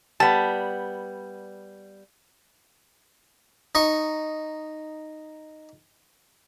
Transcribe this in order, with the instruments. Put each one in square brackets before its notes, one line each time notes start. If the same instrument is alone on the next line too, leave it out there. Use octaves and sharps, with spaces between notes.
[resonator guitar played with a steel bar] G3 B3 [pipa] A5
[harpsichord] D#4 C#6